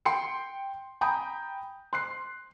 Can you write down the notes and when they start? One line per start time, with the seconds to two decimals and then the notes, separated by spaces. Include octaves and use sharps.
0.05 G5 C6 C7 C#7
1.01 G5 G#5 A#5 B5 D#6 G6
1.93 C6 F#6 C7